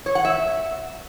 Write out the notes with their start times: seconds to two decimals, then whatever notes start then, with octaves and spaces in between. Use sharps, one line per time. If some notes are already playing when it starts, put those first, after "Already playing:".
0.06 C#5
0.15 F#5
0.25 E5